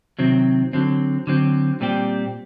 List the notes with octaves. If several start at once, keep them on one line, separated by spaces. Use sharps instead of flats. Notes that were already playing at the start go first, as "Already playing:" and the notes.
C3 D#3 F#3 C4
D3 F#3 C4
D3 F#3 C4
A#2 G3 C4 G4